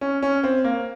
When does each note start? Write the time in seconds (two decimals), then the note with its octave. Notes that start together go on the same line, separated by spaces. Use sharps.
0.01 C#4
0.22 C#4
0.43 C4
0.64 A#3